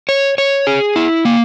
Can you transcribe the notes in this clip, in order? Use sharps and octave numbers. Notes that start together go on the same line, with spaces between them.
C#5
C#5
G#4
E4
A#3